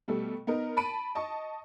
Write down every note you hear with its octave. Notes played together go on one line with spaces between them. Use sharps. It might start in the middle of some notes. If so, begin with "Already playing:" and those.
B2 G3 A3 A4
B3 D#4 A#4
A5 B5 D7 D#7
D#5 A5 C#6